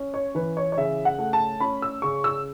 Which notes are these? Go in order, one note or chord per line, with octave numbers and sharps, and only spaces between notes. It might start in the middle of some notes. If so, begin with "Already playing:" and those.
Already playing: C#4
C#5
E3 B4
C#5
C#5
C#3 E5
F#5
A3
A5
C#4 B5
E6
C#3 C#6
E6